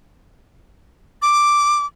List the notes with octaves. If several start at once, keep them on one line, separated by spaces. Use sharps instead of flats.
D6